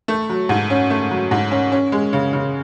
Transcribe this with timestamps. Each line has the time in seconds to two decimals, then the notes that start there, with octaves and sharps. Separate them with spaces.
0.08 A3
0.29 F#3
0.49 G#2
0.70 C#4
0.90 A3
1.11 F#3
1.31 G#2
1.51 C#4
1.72 C#4
1.92 G#3
2.13 C#3
2.33 C#3